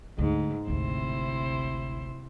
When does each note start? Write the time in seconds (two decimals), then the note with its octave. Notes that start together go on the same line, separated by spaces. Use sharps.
0.18 D2 G#2
0.68 G#1 D2 C3 E4 C5